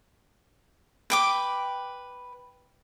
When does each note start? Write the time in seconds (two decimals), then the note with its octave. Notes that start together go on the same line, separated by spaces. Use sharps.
1.10 B4 G5 D6